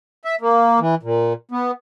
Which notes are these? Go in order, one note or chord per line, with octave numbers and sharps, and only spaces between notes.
E5
A#3
E3
A#2
B3